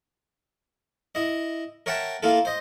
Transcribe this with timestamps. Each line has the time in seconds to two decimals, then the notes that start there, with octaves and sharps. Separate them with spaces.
1.15 E4 D#5
1.86 A#4 C#5 E5 F#5 G5 A5
2.23 A#3 E4 F4 A4
2.45 C5 D#5